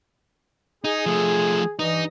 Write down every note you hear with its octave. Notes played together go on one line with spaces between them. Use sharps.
D#4 G#4
F3 A3
G2 E3 D#4 D#5